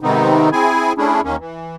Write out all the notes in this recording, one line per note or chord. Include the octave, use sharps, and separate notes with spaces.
G#2 C3 D#3 B3 C4 D#4
C4 E4 G#4 G#5
A3 C#4 D4 E4 G#4
D#2 D#3 A#3 C#4
E3